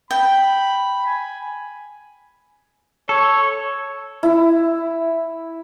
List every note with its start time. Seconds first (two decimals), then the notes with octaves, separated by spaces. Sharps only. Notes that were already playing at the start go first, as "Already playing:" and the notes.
0.11 G5 B5
1.06 G#5
3.09 A4 C#5
4.23 E4